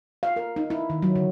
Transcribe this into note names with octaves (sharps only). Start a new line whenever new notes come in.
F5
A#4
D#4
E4
D#3
F#3
D3